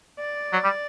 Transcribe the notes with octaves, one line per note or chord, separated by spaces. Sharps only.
D5
F#3
G3